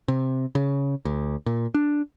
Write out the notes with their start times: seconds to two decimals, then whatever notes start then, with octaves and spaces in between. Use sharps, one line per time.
0.08 C3
0.55 C#3
1.05 D2
1.46 A#2
1.74 D4